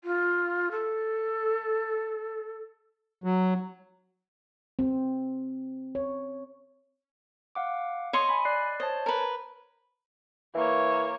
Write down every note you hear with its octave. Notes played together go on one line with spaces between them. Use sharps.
F4
A4
F#3
C4
C#5
F5 F#5 D6
C#5 D#5 C6
G#5 B5
D5 F#6 C7
C5 C#5 D#5 A5
A#4 B4
E3 A#3 C#5